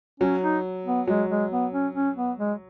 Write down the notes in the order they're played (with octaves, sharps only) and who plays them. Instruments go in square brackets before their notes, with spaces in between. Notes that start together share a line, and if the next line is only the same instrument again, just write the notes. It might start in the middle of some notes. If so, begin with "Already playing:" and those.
[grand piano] F#3 [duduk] C#4
[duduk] D#4
B3
[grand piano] F#3 [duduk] G#3
[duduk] G#3
B3
C#4
C#4
B3
G#3